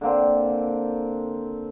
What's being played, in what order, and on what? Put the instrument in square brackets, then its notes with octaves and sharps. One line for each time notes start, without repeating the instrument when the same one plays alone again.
[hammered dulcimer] D3 A#3 C4